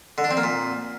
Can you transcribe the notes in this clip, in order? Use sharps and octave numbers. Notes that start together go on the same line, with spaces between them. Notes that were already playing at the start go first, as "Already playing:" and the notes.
D3
D4
C4
A#3
A#2